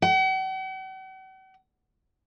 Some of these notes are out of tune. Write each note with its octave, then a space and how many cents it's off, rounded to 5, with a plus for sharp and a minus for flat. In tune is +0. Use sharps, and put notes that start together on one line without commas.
F#5 +45